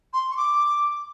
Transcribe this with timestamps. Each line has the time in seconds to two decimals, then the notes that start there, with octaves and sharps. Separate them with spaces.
0.13 C6
0.30 C#6
0.36 D6